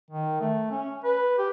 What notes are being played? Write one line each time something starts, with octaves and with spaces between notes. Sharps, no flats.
D#3
A3
C#4
B4
G4